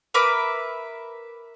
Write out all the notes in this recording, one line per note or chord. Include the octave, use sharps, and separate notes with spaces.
A#4 B4 E5 D6